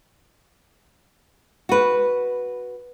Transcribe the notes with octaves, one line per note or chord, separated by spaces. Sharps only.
F#4 B4